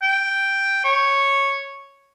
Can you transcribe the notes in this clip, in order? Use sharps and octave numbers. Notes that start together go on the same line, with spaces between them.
G5
C#5